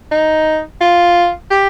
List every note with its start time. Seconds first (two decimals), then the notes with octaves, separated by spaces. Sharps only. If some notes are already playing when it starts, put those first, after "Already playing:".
0.11 D#4
0.81 F4
1.51 G4